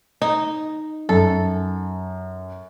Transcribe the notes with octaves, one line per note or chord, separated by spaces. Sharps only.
D#4
F#2 A4